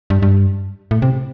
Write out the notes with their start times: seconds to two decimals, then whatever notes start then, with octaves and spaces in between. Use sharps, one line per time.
0.10 G2
0.22 G2
0.91 A2
1.02 C3